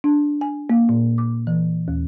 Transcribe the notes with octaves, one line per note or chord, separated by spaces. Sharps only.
D4
G#5
A#3
A#2
D6
E3
D#2